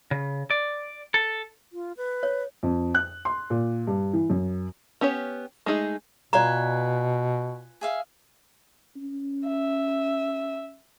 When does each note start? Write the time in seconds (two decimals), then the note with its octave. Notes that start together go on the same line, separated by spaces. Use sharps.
0.11 C#3
0.50 D5
1.14 A4
1.73 F4
1.97 B4
2.23 C#5
2.63 F2
2.95 F#6
3.25 C6
3.50 A#2
3.87 G2
4.13 E3
4.30 F#2
5.01 B3 C#4 G4 C#5
5.66 G#3 A3 D#4 G#4
6.33 B2 F4 B4 D5 G#5 A#5
7.81 G#4 E5 F5
8.96 C#4
9.47 E5